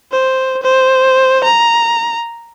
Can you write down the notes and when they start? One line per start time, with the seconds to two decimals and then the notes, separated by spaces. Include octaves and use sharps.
0.11 C5
0.63 C5
1.44 A#5